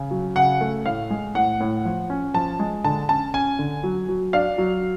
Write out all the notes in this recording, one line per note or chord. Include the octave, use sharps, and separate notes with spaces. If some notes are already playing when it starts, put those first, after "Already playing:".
Already playing: C#3
F#3
C#3 F#5
A3
A2 F5
G#3
A2 F#5
A2
F3
C#4
F3 A5
G#3
D3 A5
C#4 A5
C#4 G#5
D3
F#3
F#3
D4 F5
F#3